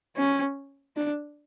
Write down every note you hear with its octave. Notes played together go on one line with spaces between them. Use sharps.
C#4
D4